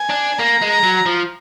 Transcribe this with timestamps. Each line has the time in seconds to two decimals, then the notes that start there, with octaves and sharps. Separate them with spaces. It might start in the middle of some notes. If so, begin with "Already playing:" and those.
Already playing: G#5
0.10 D4
0.39 A#3 A#5
0.62 G#3
0.69 A#5
0.84 F#3
1.06 F3